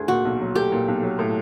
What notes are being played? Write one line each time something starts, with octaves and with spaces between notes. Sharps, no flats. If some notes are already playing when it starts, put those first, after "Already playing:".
Already playing: D2 G#4
A#2 F#4
B1
F#3
A3 G4
A#2
B1
F#3
A2